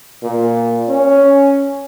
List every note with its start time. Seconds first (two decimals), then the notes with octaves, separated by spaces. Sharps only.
0.23 A#2
0.89 C#4